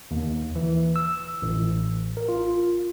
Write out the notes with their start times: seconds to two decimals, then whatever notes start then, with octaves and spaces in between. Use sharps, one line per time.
0.11 D#2
0.56 E3
0.96 E6
1.42 A1
2.17 A#4
2.29 F4